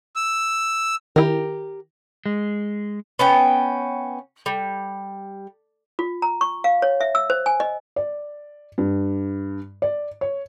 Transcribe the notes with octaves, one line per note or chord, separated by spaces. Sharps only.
E6
D#3 E4 G4 A#4
G#3
B3 C#4 G5
G3
F4
A#5
C#6
F5
C#5
E5
E6
C5
G#5
D#5
D5
G2
D5
C#5